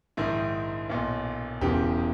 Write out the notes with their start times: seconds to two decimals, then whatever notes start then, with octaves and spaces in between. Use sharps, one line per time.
0.17 A#1 G#2 D#3 E4
0.89 B1 A#2
1.61 E1 E2 C#3 E3 G4